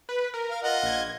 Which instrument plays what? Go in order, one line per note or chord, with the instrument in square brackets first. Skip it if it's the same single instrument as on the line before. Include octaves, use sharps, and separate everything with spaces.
[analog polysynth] B4
A#4
[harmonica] F5
F4 D#5 F#5
[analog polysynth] A#1 G#6